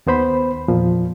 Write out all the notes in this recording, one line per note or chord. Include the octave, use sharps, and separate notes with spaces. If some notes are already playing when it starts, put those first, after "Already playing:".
D#2 B3 C5 B5
E2 A#2 F3